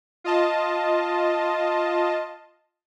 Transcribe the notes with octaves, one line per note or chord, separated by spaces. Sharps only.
F4 D#5 A5